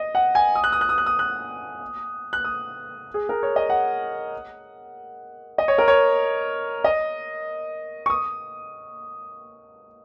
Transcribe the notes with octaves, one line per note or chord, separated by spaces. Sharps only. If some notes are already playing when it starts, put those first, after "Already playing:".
Already playing: D#5
F#5
G#5
D#6
F#6
D#6
F#6
D#6
F#6
D#6
F#6
F#6
D#6
G#4
A#4
C#5
D#5
F#5
D#5
C#5
A#4
C#5
D#5
C#6
D#6